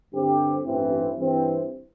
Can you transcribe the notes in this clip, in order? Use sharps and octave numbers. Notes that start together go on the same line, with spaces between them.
G2 D3 C4 G4
A1 G2 E3 C4
G2 E3 C4